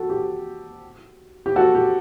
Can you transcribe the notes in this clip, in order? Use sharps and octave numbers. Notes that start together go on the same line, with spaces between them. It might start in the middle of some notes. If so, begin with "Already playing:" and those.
Already playing: F#4 A4
G4
G4
F#4 A4
G4